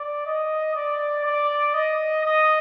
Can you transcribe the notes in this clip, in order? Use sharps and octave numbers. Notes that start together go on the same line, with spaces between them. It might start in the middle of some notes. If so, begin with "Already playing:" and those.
Already playing: D5
D#5
D5
D5
D#5
D#5